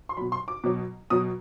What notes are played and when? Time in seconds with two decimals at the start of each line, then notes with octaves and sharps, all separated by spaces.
0.09 C6
0.17 B2 F#3 B5
0.32 C6
0.48 D6
0.64 B2 F#3
1.10 B2 F#3 D#6